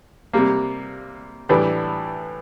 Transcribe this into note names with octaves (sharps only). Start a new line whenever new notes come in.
C3 G3 A#3
A2 E3 G3 D4